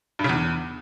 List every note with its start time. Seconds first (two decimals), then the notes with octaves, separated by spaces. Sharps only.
0.19 G2
0.24 C#3
0.29 E2